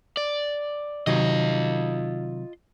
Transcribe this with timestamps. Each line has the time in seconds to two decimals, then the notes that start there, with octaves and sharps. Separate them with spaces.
0.17 D5
1.07 C3 D#3 F#3 F4 D#5